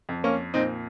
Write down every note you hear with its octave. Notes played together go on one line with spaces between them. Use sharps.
F2
A#3 C#4
A#2 C4 D#4